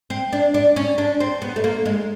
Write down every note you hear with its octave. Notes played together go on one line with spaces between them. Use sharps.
C4
D4
D4
C#4
D4
C4
B3
A3
A#3
G#3